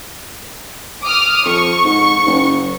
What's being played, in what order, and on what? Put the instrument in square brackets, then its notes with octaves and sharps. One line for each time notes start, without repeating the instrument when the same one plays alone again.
[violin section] D6 D#6 F6
[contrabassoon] F2 [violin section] C#6
[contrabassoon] G#2
F#1